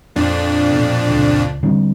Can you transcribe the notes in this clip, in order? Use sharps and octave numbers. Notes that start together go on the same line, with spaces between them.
F2 A#2 D4
B2
C#2
D3 G3 C4